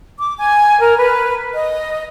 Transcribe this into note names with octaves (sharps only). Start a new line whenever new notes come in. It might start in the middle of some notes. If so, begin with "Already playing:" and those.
D6
G#5
A#4
B4
D#5